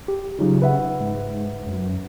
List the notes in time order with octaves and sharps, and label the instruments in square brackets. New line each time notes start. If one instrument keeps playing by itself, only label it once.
[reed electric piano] G4
[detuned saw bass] C#3 [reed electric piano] F#3 D#4 F4
[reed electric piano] B4 E5 F#5
[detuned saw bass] G#2
F#2